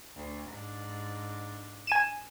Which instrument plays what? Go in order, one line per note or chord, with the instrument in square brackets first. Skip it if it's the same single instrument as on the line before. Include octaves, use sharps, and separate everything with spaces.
[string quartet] D2
G#2 D4
[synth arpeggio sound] G#5 D#7 E7